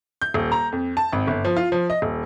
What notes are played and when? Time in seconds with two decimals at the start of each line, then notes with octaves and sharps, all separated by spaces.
0.22 G6
0.34 D#1
0.52 A#5
0.72 F2
0.97 A5
1.13 G#1
1.27 G1
1.45 F3
1.56 F4
1.72 F3
1.90 D#5
2.02 D#1